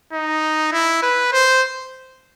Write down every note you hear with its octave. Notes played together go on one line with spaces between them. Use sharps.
D#4
E4
B4
C5